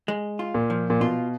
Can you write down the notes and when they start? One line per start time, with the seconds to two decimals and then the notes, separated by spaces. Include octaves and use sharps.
0.08 G#3
0.39 F4
0.54 A#2
0.70 F3
0.90 A#2
1.00 B2 F4